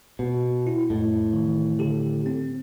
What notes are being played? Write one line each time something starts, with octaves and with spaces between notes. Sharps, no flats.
B2
E4
F2 A2
D#3 E3
D3 G4 A4
C4